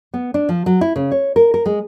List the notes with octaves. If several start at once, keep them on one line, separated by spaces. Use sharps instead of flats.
B3
D4
F3
F#3
E4
C#3
C#5
A#4
A#4
G#3